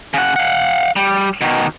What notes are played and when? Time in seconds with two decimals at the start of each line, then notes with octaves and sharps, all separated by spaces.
0.14 C#3 F#5
0.36 F5 F#5
0.96 G3
1.41 B2 D#3